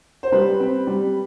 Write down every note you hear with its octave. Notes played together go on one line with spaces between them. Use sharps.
C5
G3 B4
C4
G3